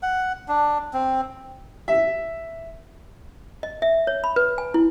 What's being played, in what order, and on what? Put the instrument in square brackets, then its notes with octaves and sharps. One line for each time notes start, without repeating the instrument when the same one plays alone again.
[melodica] F#5
D4
C4
[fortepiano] E5
[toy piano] D#5
E5
C#5
B5
B4
G#5
E4